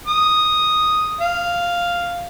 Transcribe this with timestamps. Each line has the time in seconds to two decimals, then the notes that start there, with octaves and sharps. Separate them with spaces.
0.08 D#6
1.21 F5